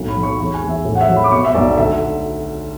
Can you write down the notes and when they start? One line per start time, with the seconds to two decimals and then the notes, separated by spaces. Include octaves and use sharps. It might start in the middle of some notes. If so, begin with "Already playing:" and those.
Already playing: B1 A2
0.08 B5
0.16 F#3
0.23 C#6
0.38 E2 B5
0.54 G#5
0.62 E2
0.69 E5
0.85 A2
0.95 F#5
1.01 E5
1.08 F#3
1.16 B5
1.24 D6
1.31 B2 C#6
1.45 E5
1.55 B1 D5
1.77 D2 E5